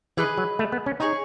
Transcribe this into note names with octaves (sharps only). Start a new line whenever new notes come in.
E3 G#4 B4 D#5
F#3
A3
B3
C#4
D#4 G#4 C#5 G#5